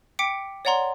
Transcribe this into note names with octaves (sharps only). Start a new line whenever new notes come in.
G5 D6 B6 C#7 D7
C#5 D5 F#5 A#5 C6